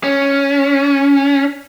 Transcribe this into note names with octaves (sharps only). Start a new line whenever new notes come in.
C#4